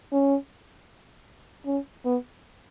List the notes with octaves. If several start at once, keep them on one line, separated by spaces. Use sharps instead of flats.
C#4
C#4
B3